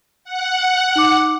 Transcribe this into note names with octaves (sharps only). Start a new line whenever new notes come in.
F#5
D#4 D6